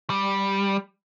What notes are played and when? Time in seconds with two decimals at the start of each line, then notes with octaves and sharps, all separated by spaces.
0.10 G3